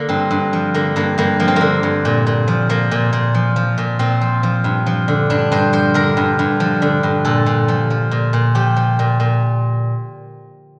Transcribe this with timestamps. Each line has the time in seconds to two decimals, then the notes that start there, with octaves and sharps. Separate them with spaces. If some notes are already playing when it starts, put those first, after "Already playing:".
Already playing: D3 A#3
0.09 G2 C4
0.31 G2
0.53 F3
0.74 D3 A#3
0.96 G2 A#3
1.18 G2 A#3
1.40 F3 A#3
1.48 C4
1.56 D3 A#3
1.83 G2
2.05 A#2
2.27 A#2
2.48 F3
2.69 F3 A#3
2.91 A#2
3.13 A#2
3.34 F3
3.56 F3
3.78 A#2
3.99 A#2 C4
4.21 F3
4.43 F3
4.64 G2
4.86 F3
5.08 D3
5.30 G2 D4
5.52 G2 C5
5.73 F3 C5
5.94 D3 A#4
6.17 G2
6.39 G2
6.60 F3
6.82 D3
7.03 G2
7.25 A#2 A4
7.46 A#2
7.68 F3
7.90 F3
8.11 A#2
8.33 A#2
8.55 F3 G4
8.76 F3
8.99 A#2
9.20 A#2